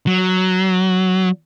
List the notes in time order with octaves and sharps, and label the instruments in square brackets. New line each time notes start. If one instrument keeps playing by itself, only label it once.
[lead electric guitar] F#3